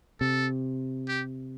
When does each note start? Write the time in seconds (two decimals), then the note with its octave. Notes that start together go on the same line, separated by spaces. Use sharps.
0.21 C3 A4
1.08 G4